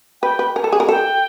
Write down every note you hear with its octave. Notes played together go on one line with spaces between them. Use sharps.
B4 G5
B4
A#4 G#5
A4 A5
G#4 G#5
A#4
A4 G5